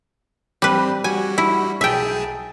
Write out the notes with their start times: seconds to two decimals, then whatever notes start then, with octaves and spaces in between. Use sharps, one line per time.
0.62 G3 C4 B4
1.04 G3 F#4 G#5
1.38 E4
1.81 B1 G#4 E5 G5 A5